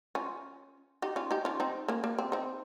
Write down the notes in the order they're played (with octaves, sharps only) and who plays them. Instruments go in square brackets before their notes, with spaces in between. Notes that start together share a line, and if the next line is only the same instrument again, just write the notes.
[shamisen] C#4 F4
D#4 G4
C#4 F4
D#4 G4
C#4 F4
C4 D#4
A#3 C#4
A#3
C4
C4 D#4